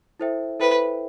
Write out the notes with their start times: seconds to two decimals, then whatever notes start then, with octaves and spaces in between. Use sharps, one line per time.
0.20 E4 A4 C5 E5 G5
0.60 E4 A4 B4 C5 E5 G5